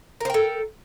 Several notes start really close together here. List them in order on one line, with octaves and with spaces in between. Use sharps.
A#4 C5 G5 A4